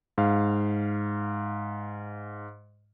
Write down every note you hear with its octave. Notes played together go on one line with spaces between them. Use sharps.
G#2 F5